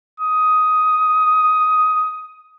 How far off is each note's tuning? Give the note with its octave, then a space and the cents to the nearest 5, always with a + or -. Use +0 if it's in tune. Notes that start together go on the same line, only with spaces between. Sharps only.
D#6 +10